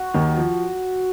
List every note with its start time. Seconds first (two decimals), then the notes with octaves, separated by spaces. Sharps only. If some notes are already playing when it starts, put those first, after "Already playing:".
Already playing: F#4
0.14 D#2 D#3
0.37 F3